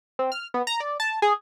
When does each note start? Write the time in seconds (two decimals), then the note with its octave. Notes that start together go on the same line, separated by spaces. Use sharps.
0.19 C4
0.32 F6
0.54 B3
0.67 A#5
0.80 D5
1.00 A5
1.22 G#4